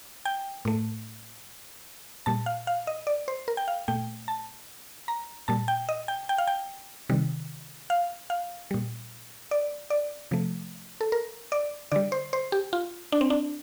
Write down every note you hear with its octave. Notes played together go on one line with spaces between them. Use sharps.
G5
A2 A3
A#2 G3 A5
F5
F5
D#5
D5
C5
A#4
G5
F5
A#2 A3 G5
A5
A#5
A#2 G3 A5
G5
D#5
G5
G5
F5
G5
C3 D#3 G3
F5
F5
A#2 G3
D5
D5
C3 F3 A3
A4
A#4
D5
D3 G3 D5
C5
C5
G4
F4
D4
C4
D4